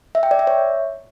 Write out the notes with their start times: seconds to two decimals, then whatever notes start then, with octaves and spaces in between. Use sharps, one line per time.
0.15 E5
0.23 G5
0.31 D5
0.39 E5
0.47 C#5